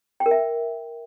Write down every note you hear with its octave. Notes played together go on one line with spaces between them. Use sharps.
G5
A#4
E5